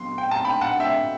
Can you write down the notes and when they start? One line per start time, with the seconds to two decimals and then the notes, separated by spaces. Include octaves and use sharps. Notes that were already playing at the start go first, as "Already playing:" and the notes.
Already playing: B2 F#3 C6
0.18 G5
0.31 A5
0.45 G5 B5
0.61 F#5 A5
0.80 E5 G5